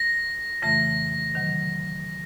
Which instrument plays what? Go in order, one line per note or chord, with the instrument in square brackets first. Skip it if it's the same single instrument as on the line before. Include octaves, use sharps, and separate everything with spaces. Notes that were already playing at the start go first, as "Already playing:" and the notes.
Already playing: [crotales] A#6
[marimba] F2 C#3 E3 A3 [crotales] A#6
[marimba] C3 D#3 F#3